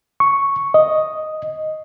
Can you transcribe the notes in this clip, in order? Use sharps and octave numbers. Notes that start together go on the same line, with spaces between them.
C#6
D#5